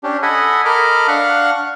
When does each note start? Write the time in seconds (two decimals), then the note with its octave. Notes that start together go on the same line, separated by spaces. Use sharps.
0.04 C#4 D4 G4
0.23 A4 D#5 F#5 G#5 B5
0.65 A4 A#4 D#5 B5 D6 F6
1.08 D4 F5 F#5 C#6 F6 F#6